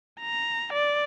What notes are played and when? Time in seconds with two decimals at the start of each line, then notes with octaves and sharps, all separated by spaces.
0.21 A#5
0.74 D5